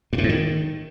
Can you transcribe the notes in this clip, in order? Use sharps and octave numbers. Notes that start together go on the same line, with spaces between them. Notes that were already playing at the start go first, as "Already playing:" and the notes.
G2
A2
G#2
D#3